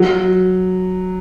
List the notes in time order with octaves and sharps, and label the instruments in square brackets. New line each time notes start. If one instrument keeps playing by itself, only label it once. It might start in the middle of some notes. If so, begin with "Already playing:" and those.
Already playing: [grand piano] F#3